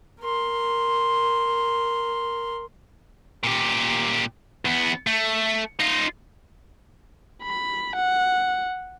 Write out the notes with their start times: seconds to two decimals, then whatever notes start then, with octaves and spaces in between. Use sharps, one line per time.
0.20 A#4 C6
3.44 A#2 G4
4.65 E2 B3
5.07 A3
5.80 D#4 F4
7.43 B5
7.96 F#5